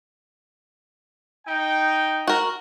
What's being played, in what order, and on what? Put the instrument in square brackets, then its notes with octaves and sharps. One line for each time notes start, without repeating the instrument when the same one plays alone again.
[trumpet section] D#4 G5
[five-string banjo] F#4 A#4